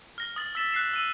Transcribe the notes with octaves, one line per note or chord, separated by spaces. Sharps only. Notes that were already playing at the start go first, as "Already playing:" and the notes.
F6 A#6 G7
D#6 A6 F#7
E6 A6 B6 E7
F#6 C7 E7
E6 D#7 F#7